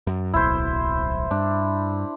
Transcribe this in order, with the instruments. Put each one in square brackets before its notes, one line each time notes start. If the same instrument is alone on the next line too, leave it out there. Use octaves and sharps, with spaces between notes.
[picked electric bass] F#2
[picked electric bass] D1 B1 [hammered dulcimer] E4 C5
[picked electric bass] G2 [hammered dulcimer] D4